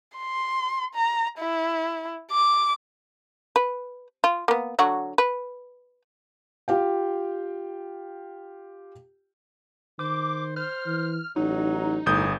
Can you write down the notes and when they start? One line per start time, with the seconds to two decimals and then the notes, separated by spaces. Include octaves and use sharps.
0.17 C6
0.94 A#5
1.38 E4
2.31 D6
3.56 B4
4.24 F4
4.48 A#3 B3
4.79 D3 F#3 F#4
5.18 B4
6.68 F4 G4 F5 G5
9.99 D#3 C5 D6
10.56 C5 F6
10.86 E3
11.36 A1 F#3 D#4
12.06 G1 A2 G#4 D#6 G6